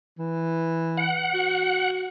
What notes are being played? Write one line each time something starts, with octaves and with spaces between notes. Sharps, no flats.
E3
F#5
F#4